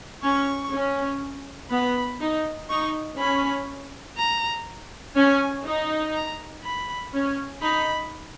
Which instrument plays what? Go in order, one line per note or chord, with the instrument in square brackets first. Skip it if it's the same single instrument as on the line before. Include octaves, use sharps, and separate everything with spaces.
[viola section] C#4 [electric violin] C#6
[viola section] C#4
[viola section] B3 [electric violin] B5
[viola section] D#4
[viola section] D#4 [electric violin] C#6
[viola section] C#4 [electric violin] B5
[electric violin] A#5
[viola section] C#4 [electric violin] G#5
[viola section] D#4
[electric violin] A#5
B5
[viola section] C#4
[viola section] D#4 [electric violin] B5